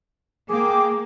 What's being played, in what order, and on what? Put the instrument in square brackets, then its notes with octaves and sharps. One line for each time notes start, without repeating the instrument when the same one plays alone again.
[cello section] A#3 [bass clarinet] G#4 [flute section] G5 D6